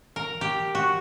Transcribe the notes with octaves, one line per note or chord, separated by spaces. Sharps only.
A#4
G4
F#4